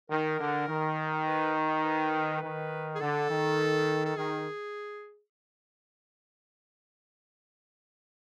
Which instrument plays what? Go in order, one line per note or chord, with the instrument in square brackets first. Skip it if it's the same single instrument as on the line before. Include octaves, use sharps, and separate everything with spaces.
[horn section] D#3 [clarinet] A#4
[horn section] D3
D#3
[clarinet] B4
B4
[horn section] D#3
[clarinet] G#4
[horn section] D3 [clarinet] A4
[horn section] D#3
[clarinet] A4
[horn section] D#3 [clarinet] G#4